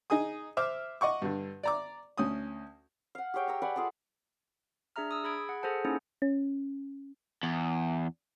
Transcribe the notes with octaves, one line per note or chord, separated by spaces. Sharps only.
D#4 G#4 G#5 D#6
C5 E5 D6 F6
D#5 F#5 C#6 D6
G2 D3
D5 A#5 D6
D2 C#4 D#6
F5 F#5
G4 G#4 C#5 G5
C#5 A#5 E6
B4 D5 F#5 G#5
F4 G#4 A4 D5
D4 G#4 E5 A#5 F6
D#6 E6
G#4 B5 G#6 D7
G#4 F#5
G#4 A4 C5 F#5 A5
A#3 C#4 D#4 E4 G#4
C#4
E2